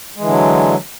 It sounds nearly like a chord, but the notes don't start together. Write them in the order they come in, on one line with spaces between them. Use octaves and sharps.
G#3 E3 D3 F#3